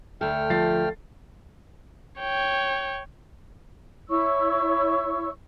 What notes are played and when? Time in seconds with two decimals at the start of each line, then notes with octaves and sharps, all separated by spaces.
0.21 D2 A3 A4 G5 F6
0.50 F3 A6 C7
2.20 C#5 G5
4.09 E4 C#5 C#6 E6